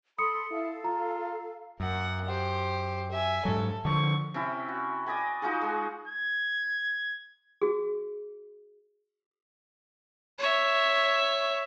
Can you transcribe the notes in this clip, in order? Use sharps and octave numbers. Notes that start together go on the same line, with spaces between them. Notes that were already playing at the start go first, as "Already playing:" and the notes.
A4 B5 C6 D#6 C#7
E4 A4 F5
F4 A#5
F#2 A#3 F#5
G4 C5
E5 G#5
G#2 F#3 A4
D3 F3 C#6
C3 C#4 E4
F#4
D5 D#5 G#5 B5
D#4 F4 F#4 G#4
G#3 G#4
G#6
F#4 G#4
C#5 E5